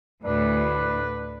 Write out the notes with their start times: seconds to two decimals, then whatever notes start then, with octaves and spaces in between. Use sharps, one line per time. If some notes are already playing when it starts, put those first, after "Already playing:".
0.24 D2 A2 D4 B4